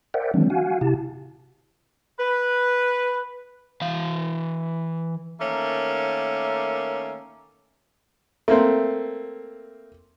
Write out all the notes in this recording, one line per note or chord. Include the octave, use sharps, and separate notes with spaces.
A#4 C5 D5 E5 F#5 G5
D#3 E3 F#3 G#3 C4 D4
F#4 F5 F#5 G#5
C3 E4 G4 A5
B4
E3 F5
D#3 A3 A#3 C#4
A3 A#3 C4